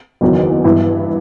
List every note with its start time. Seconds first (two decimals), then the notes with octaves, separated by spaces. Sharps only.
0.21 F#1 E2 D#3 F#3
0.64 G2 E3 B3 E4